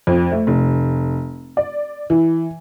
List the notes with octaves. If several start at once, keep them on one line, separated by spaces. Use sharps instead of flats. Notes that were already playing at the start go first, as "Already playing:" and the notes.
F2
A3
F1
D5
E3